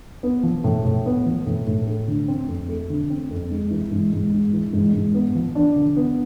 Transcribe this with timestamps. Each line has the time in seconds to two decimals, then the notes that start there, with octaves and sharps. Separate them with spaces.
0.23 B3
0.43 F3
0.64 A2
0.85 A2
1.06 B3
1.26 F3
1.46 A2
1.67 A2
1.87 A3
2.08 D3
2.28 C4
2.48 F2
2.69 A3
2.90 D3
3.10 C4
3.30 F2
3.51 G#3
3.71 E3
3.91 G#2
4.13 G#2
4.32 G#3
4.53 E3
4.73 G#2
4.94 G#2
5.14 B3
5.35 F3
5.55 D4
5.76 D3
5.97 B3